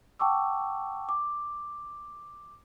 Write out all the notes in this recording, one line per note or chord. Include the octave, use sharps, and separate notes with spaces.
F#5 G5 A5 C#6 D6 E6
D6